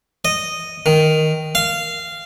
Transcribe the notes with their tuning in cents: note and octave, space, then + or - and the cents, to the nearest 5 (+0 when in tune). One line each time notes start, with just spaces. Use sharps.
D#5 -10
D#3 +0
F5 -15